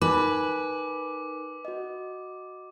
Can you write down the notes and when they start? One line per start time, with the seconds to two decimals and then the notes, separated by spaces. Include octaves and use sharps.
0.02 D#4 A#4 B4 G#5 D6
1.65 F#4 D#5